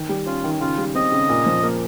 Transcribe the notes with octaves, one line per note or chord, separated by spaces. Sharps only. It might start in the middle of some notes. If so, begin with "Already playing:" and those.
Already playing: D#3
G3
C#4 F4
D#3
C#3 F4
G3
C4 D#5
C#3
A#2
F3
A#3